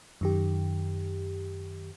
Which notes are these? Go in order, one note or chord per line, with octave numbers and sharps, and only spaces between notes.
F#2 D#3 G4